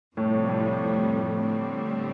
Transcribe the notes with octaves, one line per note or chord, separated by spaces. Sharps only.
F2 A2 C3 G3
A2
D3 G3 C4